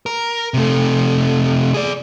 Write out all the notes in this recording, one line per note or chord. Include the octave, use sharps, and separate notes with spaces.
A#4
C3 A3
G#4 D5